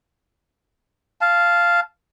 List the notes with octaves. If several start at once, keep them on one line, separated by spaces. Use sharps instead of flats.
F5 A5